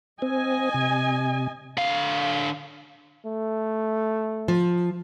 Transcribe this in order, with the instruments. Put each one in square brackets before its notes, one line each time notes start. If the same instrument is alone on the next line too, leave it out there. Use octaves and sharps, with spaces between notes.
[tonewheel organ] C4 [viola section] D#5 G#5
[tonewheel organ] C3
[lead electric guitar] D3 F5
[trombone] A3
[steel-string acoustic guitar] F3